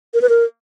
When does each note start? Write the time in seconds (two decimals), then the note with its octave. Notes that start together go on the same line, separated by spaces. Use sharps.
0.14 A#4
0.22 B4
0.29 A#4